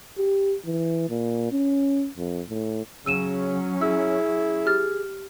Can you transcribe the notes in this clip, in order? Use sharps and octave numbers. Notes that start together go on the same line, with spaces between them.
G4
E3
A#2
C#4
F2
A2
C#3 F#3 C#4 E6 D#7 E7
E4 G#4 E6
G4 F6 A6